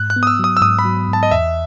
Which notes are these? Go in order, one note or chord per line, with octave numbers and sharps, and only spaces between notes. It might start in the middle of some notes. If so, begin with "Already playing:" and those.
Already playing: G#2 F#6
F#6
B3
D#6
E6
F#3 D#6
E6
G#2 D#6
B5
F#3
G#2 A5
D#5
E2 E5